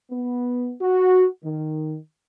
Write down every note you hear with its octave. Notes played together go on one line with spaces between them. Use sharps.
B3
F#4
D#3